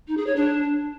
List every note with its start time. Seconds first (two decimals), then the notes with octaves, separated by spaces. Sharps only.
0.08 D#4
0.17 G#4
0.27 C#5
0.36 D4